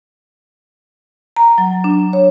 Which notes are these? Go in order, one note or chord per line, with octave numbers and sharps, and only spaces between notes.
A#5
F#3
D4
C#5